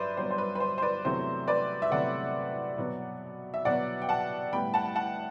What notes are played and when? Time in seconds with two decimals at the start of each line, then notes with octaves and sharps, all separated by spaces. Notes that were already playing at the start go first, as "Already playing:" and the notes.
Already playing: G2 F#3 B4 C5 D5 E5
0.17 G2 F#3 B3 C5
0.31 C5
0.38 B4
0.55 B4
0.60 C5
0.78 C5
0.82 B4 D5
1.05 E2 C3 F#3 A3 C5
1.47 B4 D5
1.82 E5
1.91 E2 C3 F#3 A3 D5 F#5
2.78 B2 F#3 B3
3.54 E5
3.65 B2 F#3 B3 D5 F#5
4.02 G5
4.09 F#5 A5
4.53 A2 G3 B3 G5 B5
4.74 F#5 A5
4.95 F#5 A5